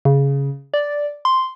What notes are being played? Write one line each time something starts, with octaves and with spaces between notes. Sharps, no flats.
C#3
D5
C6